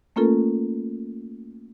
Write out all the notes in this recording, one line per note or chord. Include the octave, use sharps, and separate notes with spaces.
A3 A#3 C#4 F4 A4 A#4